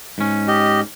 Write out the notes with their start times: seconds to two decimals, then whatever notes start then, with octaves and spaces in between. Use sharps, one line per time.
0.18 G#2 C#4
0.48 G4 D#5